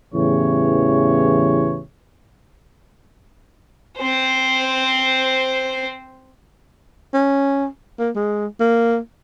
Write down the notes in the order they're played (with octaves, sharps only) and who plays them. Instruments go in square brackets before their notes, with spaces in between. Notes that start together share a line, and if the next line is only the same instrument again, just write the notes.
[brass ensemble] E2 A2 C#3 E3 G4 C#5
[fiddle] C4 C5
[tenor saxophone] C#4
A#3
G#3
A#3